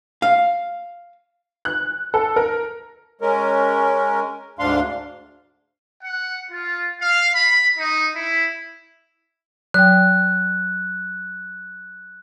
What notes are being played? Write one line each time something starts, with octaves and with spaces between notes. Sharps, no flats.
F5
F#6
A4
A#4
G#3 C#4 A#4
D2 G#2 D4 F5 C6
F#5
F4
F5
B5
D#4
E4
F#3 G5 F#6